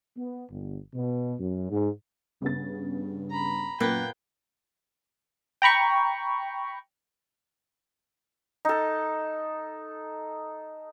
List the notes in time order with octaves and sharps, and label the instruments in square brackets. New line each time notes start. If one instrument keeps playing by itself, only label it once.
[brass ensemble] B3
G1
B2
F#2
G#2
[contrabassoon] G2 [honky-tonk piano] C#3 B3 A6
[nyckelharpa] A#5 B5
[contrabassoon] F#2 [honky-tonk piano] A#2 F#6 [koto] A#3 B3 [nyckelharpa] G5
[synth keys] G5 A#5 B5 C#6
[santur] D#4 A4